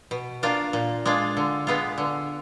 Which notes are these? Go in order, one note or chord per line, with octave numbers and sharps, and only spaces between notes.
B2
A#3 D4 F4
A#2
G#3 D4 F4
D3
G#3 B3 F4
D3